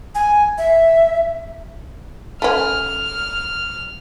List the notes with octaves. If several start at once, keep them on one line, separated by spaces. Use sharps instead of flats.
G#5
E5
A3 C#4 F6